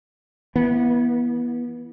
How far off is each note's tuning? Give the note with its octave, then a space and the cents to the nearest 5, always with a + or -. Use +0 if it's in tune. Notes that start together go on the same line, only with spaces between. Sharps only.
E3 +0 B3 -30